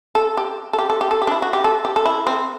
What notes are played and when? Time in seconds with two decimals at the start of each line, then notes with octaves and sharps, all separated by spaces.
0.15 A4
0.37 G4
0.73 A4
0.79 G4
0.90 A4
1.01 G4
1.11 A4
1.22 G4
1.27 D4
1.31 E4
1.42 F#4
1.53 G4
1.64 A4
1.85 G4
1.96 A4
2.05 E4
2.27 C4